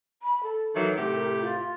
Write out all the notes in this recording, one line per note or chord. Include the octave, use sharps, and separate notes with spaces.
B5
A4
D#3 E3 F#3
A2 C3 G4
A#4
F4